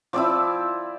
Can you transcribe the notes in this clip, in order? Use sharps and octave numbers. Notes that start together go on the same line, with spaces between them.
F3 C4 E4 D5